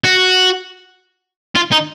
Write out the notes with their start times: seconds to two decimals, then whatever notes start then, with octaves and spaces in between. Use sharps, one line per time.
0.04 F#4
1.55 F4
1.72 D#4